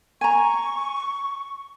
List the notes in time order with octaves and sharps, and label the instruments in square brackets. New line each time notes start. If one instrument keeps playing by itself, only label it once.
[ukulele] G#5 A#5 [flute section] C#6